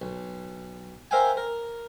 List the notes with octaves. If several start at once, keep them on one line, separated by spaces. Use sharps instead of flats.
B1
A#4 C5 E5 F5 G5 G#5
A#4